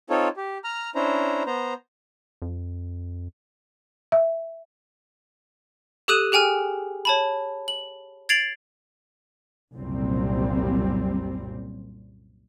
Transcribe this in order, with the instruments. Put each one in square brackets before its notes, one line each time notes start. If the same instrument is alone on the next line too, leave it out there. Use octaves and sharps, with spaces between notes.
[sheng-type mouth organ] C4 D#4 F4 A4 C#5
G4
A#5 F6
C#4 D4 E4 C5 A#5
B3 C5 A#5
[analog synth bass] F2
[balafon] E5
[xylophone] G4 A4 D#6 F#6 D#7 E7
G4 G#4 G5 G#5 F6
C#5 A5 B5
F#7
G#6 A6 C7 D7 F7 F#7
[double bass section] F#1 C2 F#2 A#2 G3 C4